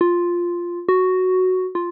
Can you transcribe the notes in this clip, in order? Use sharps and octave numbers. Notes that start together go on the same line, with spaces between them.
F4
F#4
F4